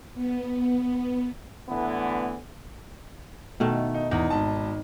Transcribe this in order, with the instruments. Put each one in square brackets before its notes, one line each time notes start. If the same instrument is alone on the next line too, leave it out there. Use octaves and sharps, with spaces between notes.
[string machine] B3
[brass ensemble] A2 D3 E3 B3
[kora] B2 D#3 A3
[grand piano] D#4
[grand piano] E2 [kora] D#4
[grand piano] G#1 A5